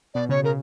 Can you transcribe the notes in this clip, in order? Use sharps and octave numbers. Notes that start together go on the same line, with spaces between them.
B2 D5
C#3 C#5
C#3 A#4